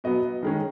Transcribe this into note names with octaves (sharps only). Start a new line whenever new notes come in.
B2 F#3 B3 D#5
D#3 G#3 C#4